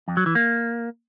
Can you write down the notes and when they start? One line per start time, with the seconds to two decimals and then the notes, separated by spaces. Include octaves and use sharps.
0.08 F2
0.17 F#3
0.26 E3
0.35 A#3